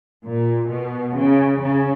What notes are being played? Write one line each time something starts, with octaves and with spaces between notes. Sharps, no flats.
A#2
B2
C#3
C#3